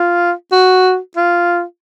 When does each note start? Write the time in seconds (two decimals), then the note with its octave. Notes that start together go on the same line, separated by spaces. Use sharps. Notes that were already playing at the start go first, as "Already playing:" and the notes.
Already playing: F4
0.52 F#4
1.17 F4